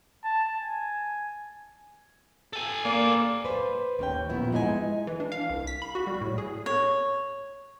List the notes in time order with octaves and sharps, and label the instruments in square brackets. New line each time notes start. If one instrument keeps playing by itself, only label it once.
[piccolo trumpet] A5
G#5
[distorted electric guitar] A4 G#5
[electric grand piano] A#3 [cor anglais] D5
[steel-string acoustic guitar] B4 C5
D#2 C#4 G5
A#2 F3 B3 E4
G#3 D#4 E4 D5 G#5
[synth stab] E3
D4
F5
C2
B6
B5
F#4
G3
A2
G#4
[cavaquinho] C#5